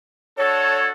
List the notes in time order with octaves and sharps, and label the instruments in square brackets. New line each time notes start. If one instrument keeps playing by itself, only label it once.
[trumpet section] D4 F#4 A4 [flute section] C#5